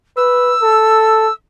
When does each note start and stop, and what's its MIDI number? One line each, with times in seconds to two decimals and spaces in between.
0.17 0.55 71
0.17 1.33 88
0.62 1.28 69